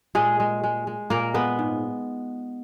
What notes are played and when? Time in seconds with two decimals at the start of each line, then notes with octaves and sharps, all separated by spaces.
0.15 A#2 G#3 G#4
0.40 G#3
0.64 G#3
0.87 G#3
1.10 A#2 A#3 A#4
1.34 G#3 B3 B4
1.59 G#2